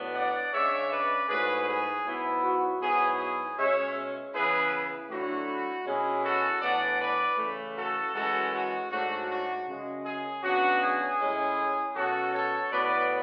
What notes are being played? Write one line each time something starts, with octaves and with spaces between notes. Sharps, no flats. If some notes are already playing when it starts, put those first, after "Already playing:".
Already playing: A2 F#3 B3 D4
D5 F#5
C#3 G#3 D4 C#5 E5
B4 D5
G#2 F#3 A3 E4 G#4 B4
G#4
G#2 F#3 B3 E4
F#4
G#2 F#3 B3 E4 G#4
G#4
B2 G#3 C#4 C#5 E5
C#3 E3 B3 E4 G#4 B4
D3 F#3 A3 E4 F#4
B2 G#3 C#4 E4 G#4
F#4 A4
A2 E3 B3 D4 D5 F#5
B4 D5
C#3 E3 A3
F#4 A4
F#2 E3 G#3 C#4 F#4 A4
F#4
G#2 F#3 A3 D4 F#4
F#4
F#2 C#3 G#3
G#4
C#3 F#3 B3 D4 F#4
G#4
A2 G#3 C#4 E4
B2 F#3 C#4 F#4 A4
A4 C#5
A2 F#3 B3 B4 D5